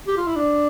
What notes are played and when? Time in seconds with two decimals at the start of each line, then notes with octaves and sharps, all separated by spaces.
0.07 G4
0.17 F4
0.27 E4
0.36 D4